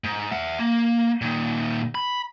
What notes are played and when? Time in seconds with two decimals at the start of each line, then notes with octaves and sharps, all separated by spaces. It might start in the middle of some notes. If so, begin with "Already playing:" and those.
0.04 G#2
0.31 E5 F#5
0.59 A#3
1.22 A#2 D#3
1.95 B5